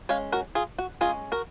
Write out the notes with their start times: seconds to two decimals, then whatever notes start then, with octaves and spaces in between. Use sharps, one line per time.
0.09 G#3 C#4 C#5 F5
0.32 F#4 A#4
0.55 F4 G#4
0.78 F#4
1.01 G#3 C#4 F4 G#4
1.32 F#4 A#4